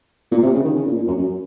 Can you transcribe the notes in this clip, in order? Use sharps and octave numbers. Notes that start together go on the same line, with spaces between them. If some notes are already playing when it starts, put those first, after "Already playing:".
A#2
C3
C#3
D#3
C#3
A#2
A#2
F#2
F#2